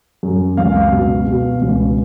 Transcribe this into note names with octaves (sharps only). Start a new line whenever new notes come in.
F#2
C#2 F5
B2
B2
C#2